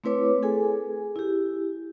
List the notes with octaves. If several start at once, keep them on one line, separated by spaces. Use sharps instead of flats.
A3 C4 E4 B4 C#5 D6
G#4 A4 G#5
E4 G4